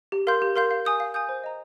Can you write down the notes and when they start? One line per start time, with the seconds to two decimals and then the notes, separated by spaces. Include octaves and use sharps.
0.12 G4
0.27 A#4 F5 C6 G6
0.42 G4
0.56 A#4 F5 C6 G6
0.71 F5
0.85 G#5 D#6 G6
1.00 F5
1.14 G#5 D#6 G6
1.29 C5
1.44 D#5 A#5